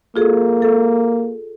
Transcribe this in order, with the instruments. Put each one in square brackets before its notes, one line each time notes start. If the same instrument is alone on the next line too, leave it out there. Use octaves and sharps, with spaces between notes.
[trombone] A#3 [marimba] F4 G#4 A4
[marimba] A4